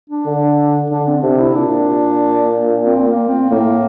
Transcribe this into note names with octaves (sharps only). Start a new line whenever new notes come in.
D4
D3
D3 D4
C4
C3 D4
E4
A#2 D4
C4
A#3
C4
A2 A#3